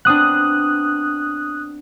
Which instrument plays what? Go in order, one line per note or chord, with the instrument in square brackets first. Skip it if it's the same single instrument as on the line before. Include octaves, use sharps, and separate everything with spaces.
[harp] B3 C4 D4 [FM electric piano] D#6 F#6